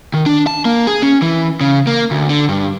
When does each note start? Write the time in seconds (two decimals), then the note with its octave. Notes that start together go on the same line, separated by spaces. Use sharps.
0.14 D#3
0.26 D4
0.47 A5
0.65 A#3
0.87 G#4
1.02 C#4
1.22 E3
1.61 C#3
1.87 A#3
2.11 D2
2.29 D3
2.49 G2